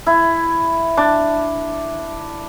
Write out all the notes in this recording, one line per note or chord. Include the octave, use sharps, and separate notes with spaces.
E4
D4